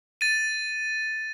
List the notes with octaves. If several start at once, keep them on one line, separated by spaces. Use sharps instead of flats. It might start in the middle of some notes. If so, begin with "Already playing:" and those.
A6 D#7